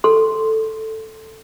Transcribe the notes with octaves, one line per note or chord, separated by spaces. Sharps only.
A4 C6